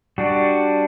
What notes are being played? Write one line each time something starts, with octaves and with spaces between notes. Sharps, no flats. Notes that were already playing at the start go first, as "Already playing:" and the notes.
G3 D4 F#4